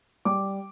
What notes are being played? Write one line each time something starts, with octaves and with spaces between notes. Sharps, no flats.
G3 D6